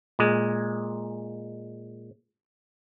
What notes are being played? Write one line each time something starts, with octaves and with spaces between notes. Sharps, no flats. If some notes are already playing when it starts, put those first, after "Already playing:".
A#2 G#3